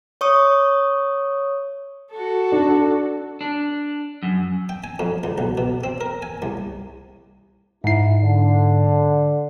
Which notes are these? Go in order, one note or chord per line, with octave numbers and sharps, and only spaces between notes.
C#5 C#6 D#6
F#4 A4
D4
D4
F#2
G5
G#5
F2
C#2
B1
B2
C4
A#4
G#5
C2
G#2 E4 C7
D3